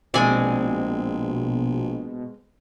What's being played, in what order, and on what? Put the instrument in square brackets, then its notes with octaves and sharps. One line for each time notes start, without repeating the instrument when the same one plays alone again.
[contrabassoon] A#1 [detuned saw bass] B2 [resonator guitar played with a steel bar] G#3 C4 [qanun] D5 G#5